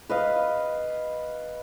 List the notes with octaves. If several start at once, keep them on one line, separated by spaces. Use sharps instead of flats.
B4 D#5 F5